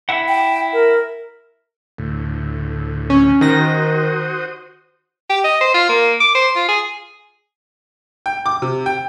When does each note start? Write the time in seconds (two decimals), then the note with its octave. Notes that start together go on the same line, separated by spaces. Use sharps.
0.09 E4 F#5
0.28 G5
0.73 A#4
1.98 D2 A2
3.10 C#4
3.41 D#3 F#4 C5 D#6 A#6
5.29 G4
5.44 D#5
5.61 C5
5.74 F4
5.89 A#3
6.21 D6
6.35 C5
6.56 F4
6.68 G#4
8.26 G5
8.46 D6
8.62 C3
8.86 G5